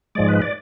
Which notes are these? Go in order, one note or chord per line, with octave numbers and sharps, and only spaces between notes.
G#2 F3 G#3 D5
B4
D5